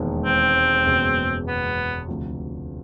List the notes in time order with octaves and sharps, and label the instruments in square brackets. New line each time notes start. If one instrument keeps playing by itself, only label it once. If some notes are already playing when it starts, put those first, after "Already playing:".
Already playing: [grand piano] E1 D#2 D#3 G#3 B3
[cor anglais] C4
[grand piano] F#1 E2 B2 G#3 C#4
[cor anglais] B3
[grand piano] D2 C3 F3